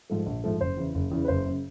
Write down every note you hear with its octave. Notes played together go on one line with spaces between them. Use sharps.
G#2 F3 A3
A#1
G#2 F3 A3
F#1 C5
E2 C#3 E3
F#1
E2 C#3 E3
B4
F#1 C5
F#2 C#3